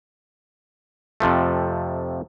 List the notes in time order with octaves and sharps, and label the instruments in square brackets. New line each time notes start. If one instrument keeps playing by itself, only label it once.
[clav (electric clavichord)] F2 C3 F3 A3